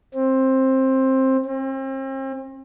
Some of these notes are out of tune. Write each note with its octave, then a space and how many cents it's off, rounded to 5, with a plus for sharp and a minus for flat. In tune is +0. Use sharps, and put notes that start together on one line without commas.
C4 +15
C4 +40